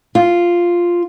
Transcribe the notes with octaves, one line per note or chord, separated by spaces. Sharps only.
F4